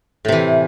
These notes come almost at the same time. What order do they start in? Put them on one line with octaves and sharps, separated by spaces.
A2 C3 E3